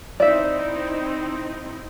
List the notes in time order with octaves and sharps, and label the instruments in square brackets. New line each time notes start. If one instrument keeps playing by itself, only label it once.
[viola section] C4 D#4 E4 [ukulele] D5 E5